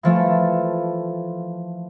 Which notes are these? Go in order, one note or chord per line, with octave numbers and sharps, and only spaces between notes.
E3 F3 A3